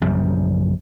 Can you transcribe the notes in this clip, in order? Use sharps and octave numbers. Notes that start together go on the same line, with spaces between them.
A#1 F#2 C#3 G3